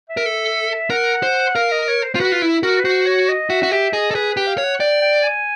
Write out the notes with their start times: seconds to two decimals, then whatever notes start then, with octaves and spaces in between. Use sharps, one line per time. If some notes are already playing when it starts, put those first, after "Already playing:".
0.09 E5
0.17 A#4
0.26 A4
0.90 A#4 F#5
1.23 C5
1.55 A#4 F5
1.72 D#5
1.88 C#5
2.04 C5
2.14 F4 C5
2.20 F#4 B4
2.32 F4
2.42 E4
2.63 F#4 A#4
2.78 B4
2.85 F#4 C5
3.06 C#5
3.29 D#5
3.50 F#4 E5
3.63 F#4
3.72 G4 E5
3.93 G#4 D#5
4.11 A4
4.15 G#4 B4
4.32 G4 B4
4.47 F5
4.58 C#5
4.64 F#5
4.80 D5 G5
5.01 G5
5.23 G#5